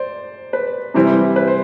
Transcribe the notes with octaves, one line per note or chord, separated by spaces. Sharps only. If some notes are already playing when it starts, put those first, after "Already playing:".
Already playing: C5 D5
B4
C3 E3 G3 C4 E4
B4
C5